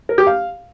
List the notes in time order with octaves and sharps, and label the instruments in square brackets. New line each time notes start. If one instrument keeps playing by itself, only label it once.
[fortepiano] A#4
G4
F5